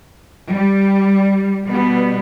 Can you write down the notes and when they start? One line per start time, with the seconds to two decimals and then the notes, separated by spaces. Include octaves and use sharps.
0.49 G3
1.67 B2 G3 B3